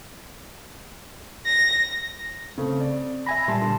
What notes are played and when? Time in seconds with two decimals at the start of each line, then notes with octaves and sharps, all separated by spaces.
1.46 A#6
2.58 C#3 A3 C4
2.80 D5
3.27 E5 G#5 B5 A#6
3.48 A#2 G3 A5 C6
3.61 D3 A5